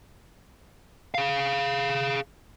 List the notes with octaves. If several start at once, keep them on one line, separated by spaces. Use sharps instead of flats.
G#4 F5